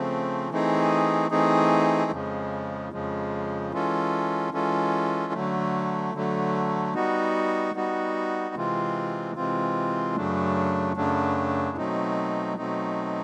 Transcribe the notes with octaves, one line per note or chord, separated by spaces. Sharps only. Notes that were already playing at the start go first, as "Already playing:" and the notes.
Already playing: C#3 F3 A3 C4
E3 A3 C4 D#4 G#4
E3 A3 C4 D#4 G#4
F2 C#3 F3 G#3
F2 C#3 F3 G#3
E3 G#3 C#4 F4 A4
E3 G#3 C#4 F4 A4
D3 F#3 A3
D3 F#3 A3
G3 B3 D#4 F#4
G3 B3 D#4 F#4
C3 E3 G#3 C4 F4
C3 E3 G#3 C4 F4
F#2 C#3 F#3 A3 D4
F#2 C#3 F#3 A3 D4
B2 F#3 A3 C4 D#4
B2 F#3 A3 C4 D#4